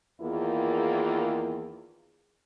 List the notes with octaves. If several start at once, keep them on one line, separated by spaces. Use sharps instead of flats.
E2 D#3 A#3 E4 F4 G#4